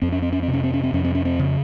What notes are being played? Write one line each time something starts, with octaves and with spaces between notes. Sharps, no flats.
F2 C4
C#4
C4
C#4
C4
C3
C#4
C4
C#4
C4
F2 C#4
C4
C#4
C4
C#3